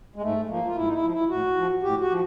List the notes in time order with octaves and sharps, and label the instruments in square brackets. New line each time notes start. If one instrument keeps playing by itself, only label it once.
[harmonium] G#3
G#2 A3
F3 A#3
F4
G#2 E4
D#4
E4
F3
E4
A2 F#4
F3
A2 G4
F#4
F3